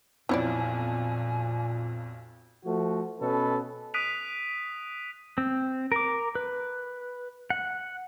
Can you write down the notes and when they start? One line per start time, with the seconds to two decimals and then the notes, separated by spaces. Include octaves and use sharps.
0.29 B1 F2 A#2 E4 C#5 D5 G#5
2.65 F3 A3 F#4
3.20 B2 C#4 A4 B4
3.94 D#6 F#6 B6 D7 D#7 F7
5.38 C4
5.92 A#4 D6
6.35 B4
7.50 F#5